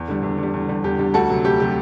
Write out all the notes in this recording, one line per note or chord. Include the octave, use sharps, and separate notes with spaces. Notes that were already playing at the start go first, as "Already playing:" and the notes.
Already playing: E2
D3 G3
E2
D3
G3
E2
D3 G3
E2 G4
D3 G3
D2 F#4 A4
C3 F#3
D2 G4
C3 F#3 G4